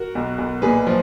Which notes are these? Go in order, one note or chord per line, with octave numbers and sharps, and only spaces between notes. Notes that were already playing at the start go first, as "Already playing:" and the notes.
Already playing: F#4 A#4
B1
B1
A#2 G#4 B4
F3